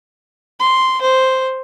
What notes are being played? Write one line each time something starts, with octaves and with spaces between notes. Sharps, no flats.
C6
C5